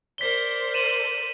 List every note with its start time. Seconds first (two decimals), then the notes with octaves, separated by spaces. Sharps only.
0.18 A#4 C5 D5 B6 G7
0.74 D#7 E7 F#7